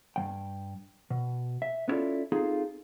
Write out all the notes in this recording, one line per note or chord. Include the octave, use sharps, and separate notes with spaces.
G2 F3 G5
B2
E5
B3 C#4 E4 F4 A4 D5
C4 D#4 F4 G#4 A4